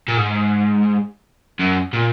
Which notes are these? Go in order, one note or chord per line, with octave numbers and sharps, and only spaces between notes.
A#2
G#2
F#2
A#2